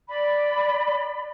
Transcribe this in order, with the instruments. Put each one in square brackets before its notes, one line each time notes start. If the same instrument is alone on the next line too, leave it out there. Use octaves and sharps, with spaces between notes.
[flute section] D5 B5